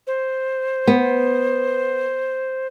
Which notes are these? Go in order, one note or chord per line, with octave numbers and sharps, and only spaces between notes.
C5
B3